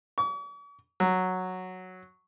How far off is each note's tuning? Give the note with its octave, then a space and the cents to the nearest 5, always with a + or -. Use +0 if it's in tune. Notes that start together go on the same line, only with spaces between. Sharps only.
C#6 +45
F#3 -5